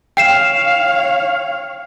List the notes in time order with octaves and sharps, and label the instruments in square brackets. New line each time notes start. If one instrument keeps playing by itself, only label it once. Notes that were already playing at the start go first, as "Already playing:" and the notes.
[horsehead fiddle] C#5 F5 [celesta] G5 C7 E7